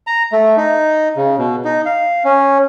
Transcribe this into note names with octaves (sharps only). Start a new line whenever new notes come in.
A#5
A3
D#4
C#3
B2
D#4
F5
C#4